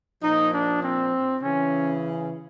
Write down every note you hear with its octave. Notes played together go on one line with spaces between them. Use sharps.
A#2 F3 D#4
D4
C4
C#3 E3 C#4